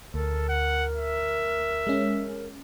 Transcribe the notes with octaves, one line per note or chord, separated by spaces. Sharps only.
D2 A4 A#4
F#5
E5
G#3 C#4